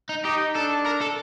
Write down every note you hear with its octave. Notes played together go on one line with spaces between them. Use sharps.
D#4
D#4 G4
D4 A4
A#4
A4